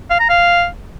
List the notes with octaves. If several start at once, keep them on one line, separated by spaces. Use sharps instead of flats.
F5
A#5
F5